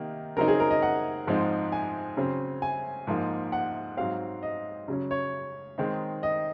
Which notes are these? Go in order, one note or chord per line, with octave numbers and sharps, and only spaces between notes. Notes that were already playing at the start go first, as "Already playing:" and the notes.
Already playing: C3 D#3 A#3 D#4
C#3 F#3 C4 D#4 A#4
G#4
A#4
D#5
F#5
G#2 F3 G#3 C4 D#4
G#5
C#3 F#3 C4
G#5
G#2 F3 A#3 D#4
F#5
G#2 F#3 C4 F5
D#5
C#3 F#3 C#4
C#5
D#3 G#3 C4 D#4
D#5